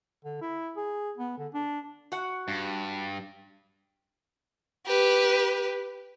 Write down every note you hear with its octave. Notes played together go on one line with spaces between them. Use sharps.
D3
E4
G#4
B3
D3
D4
F#4 F#5
G2
G4 B4